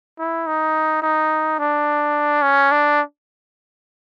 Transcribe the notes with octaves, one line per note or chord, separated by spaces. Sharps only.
E4
D#4
D#4
D4
C#4
D4